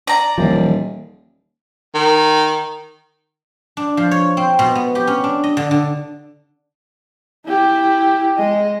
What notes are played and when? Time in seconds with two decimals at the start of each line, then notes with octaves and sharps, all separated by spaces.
0.07 D5 A#5
0.38 D#1 E3 F3
1.94 D#3
3.77 D4
3.97 F3
4.11 C#5
4.37 C4
4.59 B2
4.75 B3
4.95 G4
5.07 C#4
5.24 D4
5.44 D#5
5.57 D3
5.71 D3
7.45 E4 G4
8.37 G#3 D#5